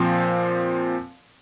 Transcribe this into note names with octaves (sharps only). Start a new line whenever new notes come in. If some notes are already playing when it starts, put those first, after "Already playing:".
Already playing: A#2 F3 C4